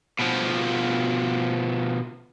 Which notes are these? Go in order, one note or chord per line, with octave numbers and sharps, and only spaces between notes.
B2 F3